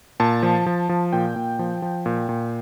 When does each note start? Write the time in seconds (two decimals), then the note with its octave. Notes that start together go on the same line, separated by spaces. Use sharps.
0.20 A#2 A5
0.43 F3
0.66 F3
0.89 F3
1.13 A#2 G5
1.36 A#2
1.59 F3
1.82 F3
2.06 A#2
2.29 A#2